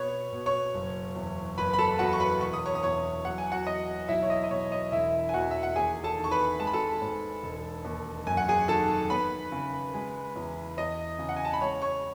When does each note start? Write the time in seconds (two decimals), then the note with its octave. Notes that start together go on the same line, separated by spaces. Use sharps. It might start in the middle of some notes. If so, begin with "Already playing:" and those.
Already playing: B2 B3 C#5 C#6
0.32 B2
0.46 C#5 C#6
0.74 F#1
1.15 E2
1.58 F#1 B4 B5
1.73 B5
1.79 A4 A5
1.99 E2 F#4 F#5
2.13 C#6
2.20 B4 B5
2.41 E1 C#6
2.54 D#6
2.66 C#5 C#6
2.75 D#6
2.83 E2 C#5 C#6
3.25 F#3 F#5
3.38 G#5
3.52 F#4 F#5
3.67 E2 D#5
4.08 B1 E4 E5
4.22 C#5
4.30 D#5
4.44 D#5
4.50 B2 C#5
4.72 D#5
4.92 E1 E4 E5
5.29 G#5
5.34 E2 F#4 F#5
5.51 E5
5.63 F#5
5.76 D#2 G#4 G#5
6.04 A4 A5
6.18 D#3
6.24 C#6
6.31 B4 B5
6.60 G#3 A5
6.67 B5
6.73 A4 A5
7.02 G#2
7.43 E1
7.85 D#2
8.27 F#2 G#5
8.37 F#5
8.49 G#4 G#5
8.68 D#3 A4 A5
9.10 B3 B4 B5
9.52 C#3
9.94 G#3
10.36 E2
10.77 E2 D#5 D#6
11.19 C#3
11.29 F#5
11.36 G#5
11.45 A5
11.53 B5
11.61 G#3 C#5 C#6
11.82 C#5 C#6